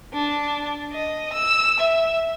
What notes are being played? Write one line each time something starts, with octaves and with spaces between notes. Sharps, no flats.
D4
D#5
E6
E5